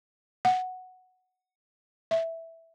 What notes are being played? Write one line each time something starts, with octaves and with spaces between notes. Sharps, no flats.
F#5
E5